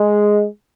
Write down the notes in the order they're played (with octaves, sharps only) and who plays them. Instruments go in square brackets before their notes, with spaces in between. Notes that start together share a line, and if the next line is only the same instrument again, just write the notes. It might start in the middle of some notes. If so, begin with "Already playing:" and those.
Already playing: [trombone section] G#3